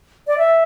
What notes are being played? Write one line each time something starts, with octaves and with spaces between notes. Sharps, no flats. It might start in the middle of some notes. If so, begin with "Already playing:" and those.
D5
E5